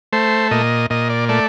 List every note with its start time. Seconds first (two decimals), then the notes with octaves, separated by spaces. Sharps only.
0.13 A3 C5
0.51 A#2 D#5
0.90 A#2 D#5
1.10 D5
1.29 A3 D5